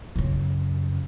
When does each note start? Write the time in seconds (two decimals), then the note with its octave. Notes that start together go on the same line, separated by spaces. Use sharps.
0.16 F#2 C#3